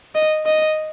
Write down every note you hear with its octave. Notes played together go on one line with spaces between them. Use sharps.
D#5
D#5